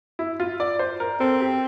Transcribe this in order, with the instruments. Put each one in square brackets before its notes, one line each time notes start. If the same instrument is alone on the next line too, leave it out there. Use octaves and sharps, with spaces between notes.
[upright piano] E4
F4
D5
C5
A#4
[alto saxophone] C4 [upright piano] A4
[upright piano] G4